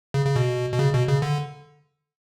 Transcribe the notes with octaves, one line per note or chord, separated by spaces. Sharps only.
C#3
C#3
B2
B2
C#3
B2
C#3
D3